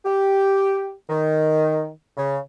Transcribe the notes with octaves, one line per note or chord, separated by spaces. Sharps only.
G4
D#3
C#3